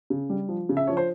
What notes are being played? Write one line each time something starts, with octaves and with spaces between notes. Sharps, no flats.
C#3
G3
F3
C#3
E5
F3 C#5
C5